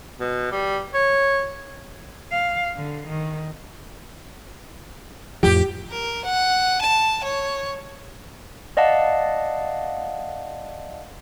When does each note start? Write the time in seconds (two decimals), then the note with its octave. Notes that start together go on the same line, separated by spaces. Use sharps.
0.20 B2
0.52 G3
0.94 C#5
2.32 F5
2.77 D3
3.08 D#3
5.43 F2 A2 F3 G4
5.90 A#4
6.25 F#5
6.82 A5
7.24 C#5
8.77 D5 D#5 F5 F#5 A5